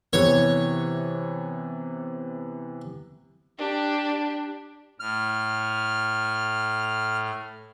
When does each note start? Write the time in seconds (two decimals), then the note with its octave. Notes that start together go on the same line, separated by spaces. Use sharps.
0.13 C3 E3 B3 C#5
3.58 D4 G4
5.00 A2 F6